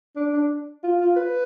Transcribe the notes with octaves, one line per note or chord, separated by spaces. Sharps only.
D4
D4
F4
F4
B4